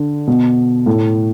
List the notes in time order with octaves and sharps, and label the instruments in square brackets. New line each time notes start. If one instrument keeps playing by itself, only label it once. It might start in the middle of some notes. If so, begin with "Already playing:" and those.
Already playing: [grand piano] D3
B2
A2